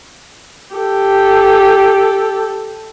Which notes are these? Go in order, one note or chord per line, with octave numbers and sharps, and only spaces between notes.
G4 A4